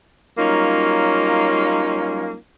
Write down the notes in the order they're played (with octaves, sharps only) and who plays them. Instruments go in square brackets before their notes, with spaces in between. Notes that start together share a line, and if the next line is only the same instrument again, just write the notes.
[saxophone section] F#3 G3 A#3 C#4 D#4 F4